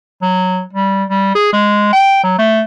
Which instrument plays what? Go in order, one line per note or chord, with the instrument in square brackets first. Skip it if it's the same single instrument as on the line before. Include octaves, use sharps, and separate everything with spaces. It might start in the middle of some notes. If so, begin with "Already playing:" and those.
[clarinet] F#3
G3
G3
G#4
G#3
G5
F#3
A3